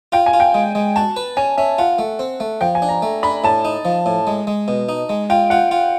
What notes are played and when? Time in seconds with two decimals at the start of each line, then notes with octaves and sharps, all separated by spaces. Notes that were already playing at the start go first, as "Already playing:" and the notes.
0.12 F4 G5
0.26 G#5
0.33 F4
0.40 G5
0.54 G#3
0.75 G#3
0.96 F#4 A5
1.16 B4
1.37 C#4 G#5
1.57 C#4 E5
1.78 F4 F#5
1.99 A3
2.19 C4
2.40 A3
2.61 F3 G5
2.75 G#5
2.82 D4
2.89 A#5
3.02 A3
3.23 D4 B5
3.44 A2 A5
3.65 D#4
3.85 F3
4.06 A2
4.27 G#3
4.47 G#3
4.68 B2
4.89 D#4
5.09 G#3
5.30 F4 G5
5.50 F4 F#5
5.71 F4